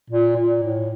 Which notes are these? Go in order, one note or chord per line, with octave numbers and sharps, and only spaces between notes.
A#2
A#2
A2